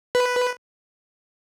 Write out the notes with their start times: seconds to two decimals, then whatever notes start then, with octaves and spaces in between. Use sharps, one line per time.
0.15 B4